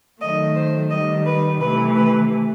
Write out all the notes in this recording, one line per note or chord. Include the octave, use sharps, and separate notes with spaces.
D#3 F#3 A3 D#5
C5
D#3 G3 D#5
B4
C3 E3 A3 B4
B4